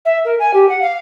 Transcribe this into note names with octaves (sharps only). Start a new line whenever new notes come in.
E5
A#4
G#5
G4
F#5
F5